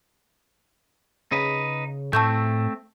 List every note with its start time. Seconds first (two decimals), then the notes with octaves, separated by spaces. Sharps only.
1.32 C#3 D#4 B4
2.13 A2 A3 C4 A5 C#6 G6